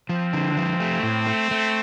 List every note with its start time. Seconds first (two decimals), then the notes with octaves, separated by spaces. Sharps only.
0.09 F3 C4
0.33 D3
0.57 F3
0.80 A3
1.03 A2
1.27 A3
1.51 A3